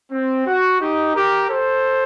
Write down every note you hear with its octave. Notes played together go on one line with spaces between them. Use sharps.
C4
F#4
D#4 G4
G4 A#4
A4 C5